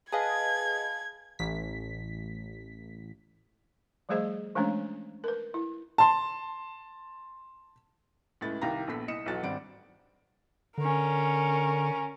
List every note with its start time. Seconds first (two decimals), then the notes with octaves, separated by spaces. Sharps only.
0.12 G#4 B4 D#5 F5 G#5 A5 G#6
1.39 A1 B6
4.09 F3 G3 A3 G#4 C5 D#5
4.55 E3 G#3 A3 C#4 D4 C#5
5.24 A#4 B4
5.54 E4
5.98 A5 C6
8.41 C#2 A2 A6
8.61 C2 D#3 G4 F5 A#5 A#6
8.87 A#1 B3 A4 B6
9.08 C2 D#5 D#6 C#7 E7
9.26 B1 E2 F#3 A6
9.43 G#1 G3 C4 D4 F#5 D7
10.78 D3 C#4 A#4